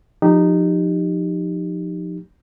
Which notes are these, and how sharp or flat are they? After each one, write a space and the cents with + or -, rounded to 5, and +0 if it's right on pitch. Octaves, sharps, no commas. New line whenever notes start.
F3 +20 D#4 -15 G4 +0